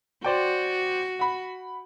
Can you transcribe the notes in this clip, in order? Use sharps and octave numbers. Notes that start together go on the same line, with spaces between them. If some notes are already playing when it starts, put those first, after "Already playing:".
F#4 C5 D5 G5
F#5 B5